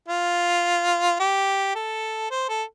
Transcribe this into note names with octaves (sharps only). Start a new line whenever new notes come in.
F4
G4
A4
C5
A4